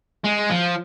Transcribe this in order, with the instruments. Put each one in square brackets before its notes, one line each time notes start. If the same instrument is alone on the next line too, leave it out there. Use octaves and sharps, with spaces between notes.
[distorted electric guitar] G#3
F3